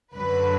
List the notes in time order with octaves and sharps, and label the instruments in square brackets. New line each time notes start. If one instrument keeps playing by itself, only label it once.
[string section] F#2 D3 F#3 B4